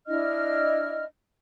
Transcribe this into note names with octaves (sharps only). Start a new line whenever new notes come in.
D4 E4 D#5 F6